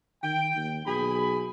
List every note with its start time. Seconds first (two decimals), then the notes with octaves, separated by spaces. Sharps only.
0.23 D#3 G5
0.56 D#2
0.86 B1 G#4 B5